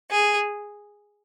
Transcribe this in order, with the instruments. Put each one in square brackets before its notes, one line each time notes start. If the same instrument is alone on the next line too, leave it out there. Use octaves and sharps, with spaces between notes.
[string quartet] G#4